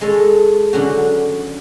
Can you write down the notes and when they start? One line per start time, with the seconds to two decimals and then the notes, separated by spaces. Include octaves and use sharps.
0.01 G#3 A4 C#5
0.73 D3 F#3 C#4 F#4